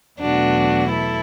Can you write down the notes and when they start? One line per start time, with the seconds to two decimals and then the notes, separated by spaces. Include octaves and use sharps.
0.21 E2 B2 F#3 A3 D4 F#4
0.90 E4 A4